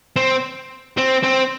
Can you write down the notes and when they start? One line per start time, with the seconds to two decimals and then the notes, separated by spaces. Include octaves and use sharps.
0.16 C4
0.97 C4
1.23 C4